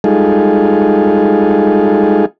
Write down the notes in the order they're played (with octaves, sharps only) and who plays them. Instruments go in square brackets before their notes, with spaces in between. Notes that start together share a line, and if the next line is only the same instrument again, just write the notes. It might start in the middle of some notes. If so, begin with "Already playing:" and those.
[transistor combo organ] G3 G#3 D#4 F4 G#4 A4